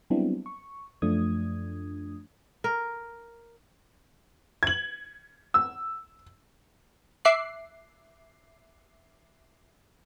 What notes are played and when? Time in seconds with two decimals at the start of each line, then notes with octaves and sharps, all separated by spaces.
0.10 F#3 G3 B3 C4 D4 E4
0.46 C#6
1.02 F#2 F3 A3 D4 D#6 G#6
2.64 A#4
4.63 G#6 F#7
5.54 E6
7.25 E5 D6 F#6 C7